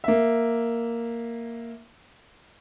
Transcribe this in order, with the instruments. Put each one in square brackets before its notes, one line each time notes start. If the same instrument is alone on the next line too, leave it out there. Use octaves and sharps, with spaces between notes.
[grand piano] A#3 E5